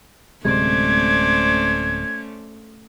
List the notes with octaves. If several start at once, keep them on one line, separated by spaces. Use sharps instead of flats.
D1 C3 G#3 A3 C#4 C5 D5 G#6